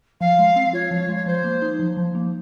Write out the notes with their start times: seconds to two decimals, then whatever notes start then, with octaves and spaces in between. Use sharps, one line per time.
0.21 F3 F5
0.39 G#3
0.56 C4
0.73 F4 C#5
0.91 F3
1.09 G#3
1.15 C#5
1.26 F3 C5
1.44 A#3
1.62 D#4
1.80 F3
1.97 F3
2.15 A#3